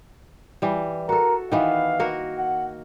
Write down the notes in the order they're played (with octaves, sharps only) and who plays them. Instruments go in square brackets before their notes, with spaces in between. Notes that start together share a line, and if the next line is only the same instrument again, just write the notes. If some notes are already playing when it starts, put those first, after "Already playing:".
[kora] E3 G3
[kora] F#4 A4 [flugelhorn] A#4
[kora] D#3 E3 B3 [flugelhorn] F5
[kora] A#3 F#4 A#4
[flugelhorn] F#5